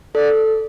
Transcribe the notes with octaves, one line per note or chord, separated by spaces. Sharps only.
A4 D5